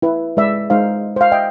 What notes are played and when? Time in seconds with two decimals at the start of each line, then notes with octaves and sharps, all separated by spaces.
0.02 E4 B4
0.37 G#3 B4 D5 E5
0.70 G#3 D#4 C5 F5
1.16 C5 F5
1.32 D#5 E5 G5